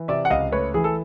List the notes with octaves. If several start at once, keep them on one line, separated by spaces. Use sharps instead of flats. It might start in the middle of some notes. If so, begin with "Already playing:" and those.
Already playing: E3
C3 D5 E5
F#5
C#2 D#5 F5
A3 B4 C#5
E3 G#4
A4